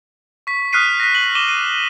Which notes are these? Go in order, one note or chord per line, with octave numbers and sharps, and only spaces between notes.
C#6 B6
D#6 F6 F#6 B6 C7 D#7
A#6 B6
F#7
D6 D#7 E7 G7
D#7